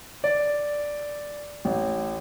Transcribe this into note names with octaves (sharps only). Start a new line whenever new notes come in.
D5
A1